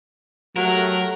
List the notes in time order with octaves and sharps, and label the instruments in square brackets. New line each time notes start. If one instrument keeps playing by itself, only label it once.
[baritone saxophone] F#3 [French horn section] A3 G4 [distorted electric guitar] A#4